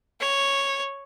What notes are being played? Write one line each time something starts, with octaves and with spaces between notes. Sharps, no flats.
C#5